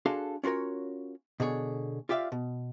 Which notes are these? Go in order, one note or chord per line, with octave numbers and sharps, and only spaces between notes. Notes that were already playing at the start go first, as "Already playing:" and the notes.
D4 F#4 G#4 A4 F5 C6
C#4 F4 F#4 A#4 C#5
B2 D3 G#4 C#5
F4 G4 D5 E5 F5
B2